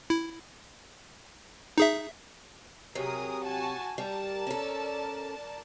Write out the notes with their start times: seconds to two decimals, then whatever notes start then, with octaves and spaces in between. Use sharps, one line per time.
0.10 E4
1.78 D#4 G#4 E5
2.95 C3 F#3 G#4 A#4 D#6
3.43 F#4 G#5 A5
3.98 G3 A#4 D5 A5
4.47 C#4 A4